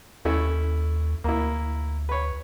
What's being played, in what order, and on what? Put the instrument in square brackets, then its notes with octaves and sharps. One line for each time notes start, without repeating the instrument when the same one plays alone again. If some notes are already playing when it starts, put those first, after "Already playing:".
[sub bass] D#2 [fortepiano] A3 C#4 E4
[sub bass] D2 [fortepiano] A#3 E4
[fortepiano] B4 C#5